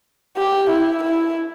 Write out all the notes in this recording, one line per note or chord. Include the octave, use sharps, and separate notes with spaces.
G4
E4
E4